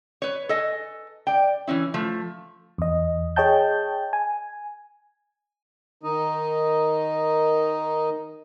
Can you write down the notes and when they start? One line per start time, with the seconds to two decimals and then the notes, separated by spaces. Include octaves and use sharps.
0.22 B4 C#5
0.49 A4 D#5 G#5
1.27 D5 G5
1.67 E3 F#3 C#4 E4
1.94 F3 A3
2.78 E2 D#5
3.36 G#4 C#5 D#5 G5 A5 G6
4.13 G#5
6.03 D#3 D#4 D#5